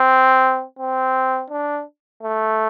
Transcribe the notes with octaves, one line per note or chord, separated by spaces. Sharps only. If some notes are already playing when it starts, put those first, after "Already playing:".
Already playing: C4
C4
D4
A3